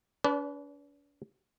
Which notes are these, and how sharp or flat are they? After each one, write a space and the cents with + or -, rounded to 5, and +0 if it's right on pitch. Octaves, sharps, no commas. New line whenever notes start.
D4 -45 B4 +0 D5 -20